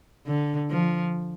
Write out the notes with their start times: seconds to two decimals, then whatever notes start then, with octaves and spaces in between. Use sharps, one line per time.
0.27 D3
0.70 F3